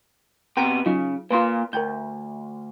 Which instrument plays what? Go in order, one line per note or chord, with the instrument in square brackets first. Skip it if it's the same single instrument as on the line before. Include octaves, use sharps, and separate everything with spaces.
[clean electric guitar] C3 B3 [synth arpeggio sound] G5 A#5 D7
[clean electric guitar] C#3 [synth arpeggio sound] F#3 D#4 F4
[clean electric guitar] A#2 A#3 C6 [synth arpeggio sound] F4 B4
[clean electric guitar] D2 [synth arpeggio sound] A#4 G5 G6